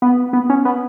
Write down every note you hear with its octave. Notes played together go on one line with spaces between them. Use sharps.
B3
B3
C#4
B3